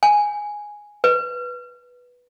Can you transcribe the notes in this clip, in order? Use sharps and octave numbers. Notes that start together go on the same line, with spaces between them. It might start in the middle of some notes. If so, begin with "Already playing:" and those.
G#5
B4